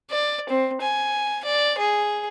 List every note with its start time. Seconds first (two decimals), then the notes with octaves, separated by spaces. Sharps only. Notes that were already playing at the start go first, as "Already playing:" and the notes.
0.10 D5
0.49 C4
0.81 G#5
1.45 D5
1.78 G#4